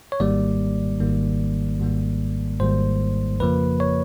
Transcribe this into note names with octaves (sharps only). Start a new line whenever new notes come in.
C#5
G#1 G#2 D#3 G3 A#3 D5
G#1 G#2 D#3 G3 A#3
G#1 G#2 D#3 G3 A#3
G#1 G#2 D#3 G3 A#3 C5
F2 C#3 F3 A#3 B4
C#5